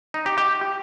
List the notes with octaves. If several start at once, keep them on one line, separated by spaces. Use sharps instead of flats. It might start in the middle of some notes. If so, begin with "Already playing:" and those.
D#4
G4
G4